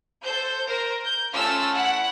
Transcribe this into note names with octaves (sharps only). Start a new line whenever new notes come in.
A4 C5 G6
A#4 C5
G6
A3 C#4 F4 E6 F6
E4 F#5